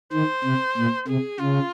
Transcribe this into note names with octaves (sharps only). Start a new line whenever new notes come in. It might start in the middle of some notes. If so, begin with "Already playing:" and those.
D#3 C5
C3
A#2
C3 G#4
C#3 F4